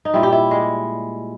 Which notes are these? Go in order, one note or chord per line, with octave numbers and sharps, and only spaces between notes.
D#4
A#2 G3 E4
G4
E4
G#3